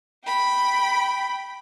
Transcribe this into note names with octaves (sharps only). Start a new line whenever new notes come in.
G5 B5